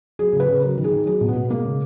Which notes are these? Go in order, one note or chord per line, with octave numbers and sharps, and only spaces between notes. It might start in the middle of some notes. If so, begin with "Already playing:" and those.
F#3 G#4
C#3
B4
C#3
F#3 A#4
D#3
G#4
D#3
F#3 G#4
B2
B3
B2
G#3 A#3
C#3